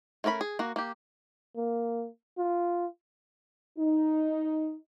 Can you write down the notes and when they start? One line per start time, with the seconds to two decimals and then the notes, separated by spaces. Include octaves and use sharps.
0.24 A3 C#4 A#4 D5 B5
0.41 G#4
0.59 A#3 F#4
0.76 A#3 G4
1.56 A#3
2.38 F4
3.78 D#4